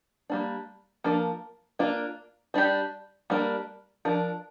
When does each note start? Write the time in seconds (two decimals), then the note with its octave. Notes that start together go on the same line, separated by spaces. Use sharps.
0.30 G3 A#3 D4
1.04 F3 A#3 D4 A#4
1.79 A#3 D4 F4
2.54 G3 D4 G4
3.30 G3 A#3 D4 A#4
4.05 F3 D4 A#4